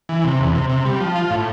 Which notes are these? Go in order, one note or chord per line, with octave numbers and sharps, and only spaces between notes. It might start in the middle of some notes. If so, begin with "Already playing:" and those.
E3
C3
E2
C3
C3
G3
F3
F4
A2